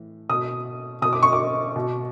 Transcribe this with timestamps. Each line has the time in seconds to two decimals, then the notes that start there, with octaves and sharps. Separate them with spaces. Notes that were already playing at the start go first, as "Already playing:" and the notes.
Already playing: A2 E3
0.29 B2 D#6
1.02 B2 D#6
1.13 D6
1.23 C#6
1.33 D6
1.76 B2